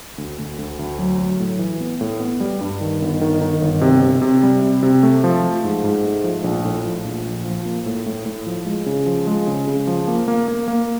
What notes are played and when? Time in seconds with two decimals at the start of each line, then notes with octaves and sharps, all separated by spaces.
0.18 D2
0.39 D2
0.58 D2
0.79 D2
0.99 F#3
1.19 F#3
1.40 A2
1.59 E3
1.80 B3
2.01 A2
2.20 B3
2.40 G3
2.61 G2
2.81 D#3
3.02 G1
3.21 D#3
3.41 D#3
3.62 G1
3.81 C3
4.02 C3
4.22 C3
4.43 G3
4.62 C3
4.83 C3
5.03 A3
5.24 F3
5.44 F3
5.64 G#2
5.84 G#2
6.04 A3
6.24 F3
6.44 A#1
6.65 A2
6.85 F3
7.04 A#1
7.25 A#1
7.45 F3
7.65 A#3
7.86 A2
8.06 A2
8.26 A2
8.47 F3
8.66 G#3
8.86 C#3
9.06 F3
9.27 G#3
9.47 C#3
9.67 C#3
9.87 F3
10.08 A#3
10.28 A#3
10.48 A#3
10.68 A#3